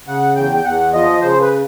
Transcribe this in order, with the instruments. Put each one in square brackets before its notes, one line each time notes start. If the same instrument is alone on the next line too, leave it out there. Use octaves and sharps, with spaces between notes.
[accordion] C#3 F#5
E2 G5
G5
E2 F#5
F3 D#5
C#3 C5
B4